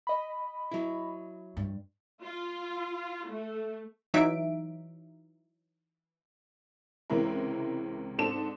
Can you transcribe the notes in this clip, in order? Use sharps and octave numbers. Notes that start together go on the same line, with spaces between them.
D#5 B5
F#3 E4
G2
F4
A3
E3 F#3 D#4 E5 D7
C#2 C3 E3 G#3 E4 A#4
G#2 C4 D4 A4 A5 E7